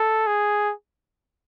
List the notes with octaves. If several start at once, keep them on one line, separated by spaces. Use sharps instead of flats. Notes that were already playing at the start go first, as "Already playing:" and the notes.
Already playing: A4
G#4